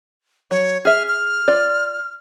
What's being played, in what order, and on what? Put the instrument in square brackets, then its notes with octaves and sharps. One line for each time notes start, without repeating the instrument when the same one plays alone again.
[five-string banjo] F#3 [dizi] C#5
[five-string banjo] G#4 E5 [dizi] F6
[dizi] F6
[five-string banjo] F4 D5